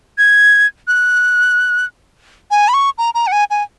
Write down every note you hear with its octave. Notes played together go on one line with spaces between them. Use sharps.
G#6
F#6
G#5
B5
C#6
A#5
A#5
F#5
G#5
G#5